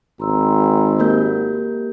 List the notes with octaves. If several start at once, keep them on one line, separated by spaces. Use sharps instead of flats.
G#1 A#5 C6 E6
A#3 G4 A#4 G6